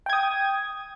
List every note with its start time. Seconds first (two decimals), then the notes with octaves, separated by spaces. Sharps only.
0.06 G5
0.10 G#6
0.13 D#6